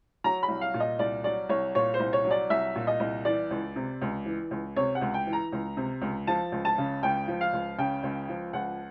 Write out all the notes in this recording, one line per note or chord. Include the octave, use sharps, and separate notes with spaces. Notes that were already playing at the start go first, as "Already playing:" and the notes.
F#3 A#5
B5
C2
F5
A#2
D#5
C2 D5
F#3 D5
C2 C#5
A#2 C#5
C5
C2
C#5
F#3
D5
C2 E5
A#2
D#5
C2
E3 D5
C#2
C3
C#2
E3
C#2
C3 C#5
F#5
C#2
G5
E3
A#5
C#2
C3
C#2
F3 A5
C#2
A5
C#3
C#2 G5
F3
F5
C#2
C#3 G5
C#2
F3
C#2 F#5